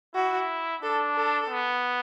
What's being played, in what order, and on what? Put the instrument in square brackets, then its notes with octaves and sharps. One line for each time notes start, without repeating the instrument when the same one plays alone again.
[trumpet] E4 [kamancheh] F#4
[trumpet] D4 [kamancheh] A4
[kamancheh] A4
[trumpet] B3